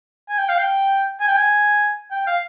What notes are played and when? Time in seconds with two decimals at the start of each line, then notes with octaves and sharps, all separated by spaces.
0.29 G#5
0.38 G5
0.49 F5
0.58 G5
1.20 G#5
1.27 G5
1.36 G#5
2.11 G5
2.27 F5